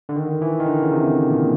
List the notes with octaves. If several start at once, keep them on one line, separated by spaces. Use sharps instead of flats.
D3
D#3
E3
D#3
D3
C#3
C3
A#2